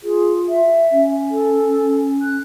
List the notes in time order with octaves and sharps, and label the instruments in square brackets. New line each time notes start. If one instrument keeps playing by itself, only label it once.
[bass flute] F4 [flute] G#4
[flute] E5
[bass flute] C#4
[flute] A4
F#6